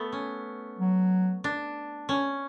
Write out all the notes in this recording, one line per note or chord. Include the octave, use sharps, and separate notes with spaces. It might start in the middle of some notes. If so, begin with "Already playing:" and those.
Already playing: A3 B3
C#4
F#3
D4
C#4